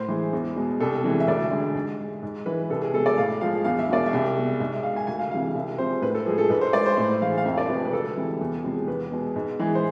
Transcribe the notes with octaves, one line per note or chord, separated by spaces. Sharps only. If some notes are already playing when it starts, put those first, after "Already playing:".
Already playing: A2 C5
E3 G#3
E2
B2 G#3
C2 A4
C3 E3 G#3
E5
D2 D5
D3 G#3
G#2
G#3
G#2
E3 G#3 B4
C2 A4
G#4
B2 G#3 A4
D5
A2 F5
F3 G#3 F5
E2 F5
E5
B2 G#3 D5
E5
C2
B2 G#3
G#2 E5
E5
G#3 F5
G#5
D2 G#5
F5
C3 E3 G#3 F5
F5
C2 E5
C3 F3 G#3 C5
A2 B4
A4
F3 G#3 G#4
A4
G#2 B4
C5
G#3 D5
C5
A2 C5
E3 G#3 F5
F5
F2 E5
D5
C3 F3 G#3 B4
B4
D2 A4
C3 E3 G#3
E2
C3 F3 G#3
E2 B4
B2 G#3
G#2
E3 G#3
C5